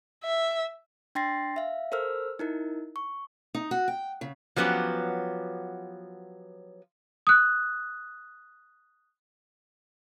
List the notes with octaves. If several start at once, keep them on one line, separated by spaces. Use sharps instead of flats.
E5
D4 G5 C6 A6 A#6 C7
E5 F5
A4 A#4 C5 E6 F6
D#4 E4 A#4
C#6
D#4
F#4
G5
C#3
F3 F#3 B3 C#4 G4
D#6 F#6